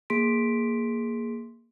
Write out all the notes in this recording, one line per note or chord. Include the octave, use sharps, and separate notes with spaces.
A#3 G#4 C6 B6 D7